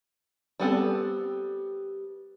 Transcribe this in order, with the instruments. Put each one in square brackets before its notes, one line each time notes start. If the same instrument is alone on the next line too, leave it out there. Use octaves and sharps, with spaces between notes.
[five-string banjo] G3 B3 C4 A4